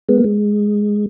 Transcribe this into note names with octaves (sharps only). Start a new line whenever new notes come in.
G#3 B3
A#3
G#3